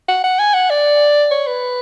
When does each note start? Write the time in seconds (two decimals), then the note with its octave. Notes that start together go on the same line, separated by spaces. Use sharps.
0.09 F#5
0.24 F#5
0.39 G#5
0.54 F#5
0.70 D5
1.31 C#5
1.47 B4